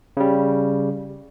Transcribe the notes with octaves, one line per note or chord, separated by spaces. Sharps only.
C#3 G3